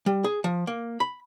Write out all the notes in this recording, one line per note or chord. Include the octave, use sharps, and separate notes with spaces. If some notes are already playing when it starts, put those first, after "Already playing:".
G3
G#4
F3
A#3
B5